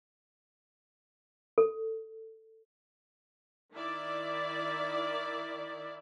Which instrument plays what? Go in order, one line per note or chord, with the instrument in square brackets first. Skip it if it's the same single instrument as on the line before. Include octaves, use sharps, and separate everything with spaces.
[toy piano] A4
[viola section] D#3 E4 D5